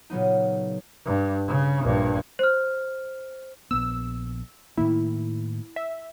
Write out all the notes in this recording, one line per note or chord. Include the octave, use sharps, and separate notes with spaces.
A#2 C#3 F#3 B3 D#4
G2
C#3
A#1 G2
C5 F6
A#1 B3 E6
A2 D#3 A#3 E4
E5